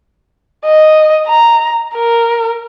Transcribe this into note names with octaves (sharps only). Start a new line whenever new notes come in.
D#5
A#5
A#4